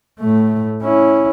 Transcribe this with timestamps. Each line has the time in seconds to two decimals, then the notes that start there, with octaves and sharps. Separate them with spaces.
0.20 A2 A3
0.83 C#4 E4